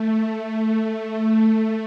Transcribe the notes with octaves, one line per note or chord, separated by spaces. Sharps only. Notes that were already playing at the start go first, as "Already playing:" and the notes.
Already playing: A3